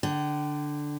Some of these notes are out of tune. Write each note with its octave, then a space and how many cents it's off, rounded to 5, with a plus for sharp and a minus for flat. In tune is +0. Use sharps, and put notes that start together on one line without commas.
D3 +0 G5 -40